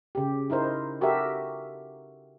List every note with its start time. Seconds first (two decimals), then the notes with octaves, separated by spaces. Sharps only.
0.15 C#3 G4
0.50 D#4 E4 A#4 C5
1.01 F#4 G4 A4 A#4 E5